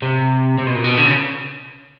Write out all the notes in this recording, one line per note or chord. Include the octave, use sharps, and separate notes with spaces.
C3
C3
B2
A#2
B2
D3
C#3